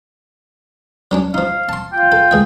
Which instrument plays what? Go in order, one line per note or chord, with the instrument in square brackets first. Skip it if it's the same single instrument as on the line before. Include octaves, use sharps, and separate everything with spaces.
[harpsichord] F#3 C#4 D4
[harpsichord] F3 D#4 [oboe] F5
[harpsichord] A5 C6
[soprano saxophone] F4 [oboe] G5
[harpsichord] A4
C#2 G#4 E5